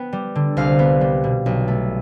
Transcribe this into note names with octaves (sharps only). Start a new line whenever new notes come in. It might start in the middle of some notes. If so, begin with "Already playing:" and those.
Already playing: B3 G5
G3
D3
C2 F5
B3
G3
B2
B1
A3